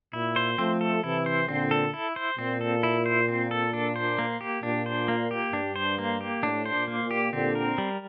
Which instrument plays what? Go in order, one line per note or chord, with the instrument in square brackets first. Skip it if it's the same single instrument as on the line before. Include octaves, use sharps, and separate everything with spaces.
[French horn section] A#2 [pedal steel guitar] E4
[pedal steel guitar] C5
[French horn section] F3 A3 [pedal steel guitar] C4
[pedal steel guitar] A4
[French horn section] C3 E3 [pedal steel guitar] E4
[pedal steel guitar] C5
[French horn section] A#2 D3 [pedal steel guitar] C4
[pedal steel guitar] A4
E4
C5
[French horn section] A#2 [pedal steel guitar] C4
[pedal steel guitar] A4
E4
C5
C4
A4
D4
C5
A#3
G4
[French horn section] A#2 [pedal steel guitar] D4
[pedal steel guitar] C5
A#3
G4
[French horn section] G2 [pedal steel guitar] D4
[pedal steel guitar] C5
A#3
G4
[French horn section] A2 [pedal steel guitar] D4
[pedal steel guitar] C5
[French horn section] A#2
[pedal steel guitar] A#3
[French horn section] A#2
[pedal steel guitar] G4
[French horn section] A#2 D3 [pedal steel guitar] C4
[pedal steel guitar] A#4
G3